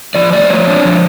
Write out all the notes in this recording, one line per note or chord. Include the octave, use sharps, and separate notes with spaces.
F3 D5
A3 D5
F3 C#5
D4
F3